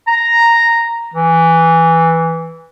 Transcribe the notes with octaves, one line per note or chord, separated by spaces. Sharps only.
A#5
E3